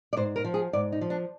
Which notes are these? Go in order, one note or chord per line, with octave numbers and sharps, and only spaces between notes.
D5
G#2 C5
A#4
F3
G#4
G#2 D5
D#4
F3
D4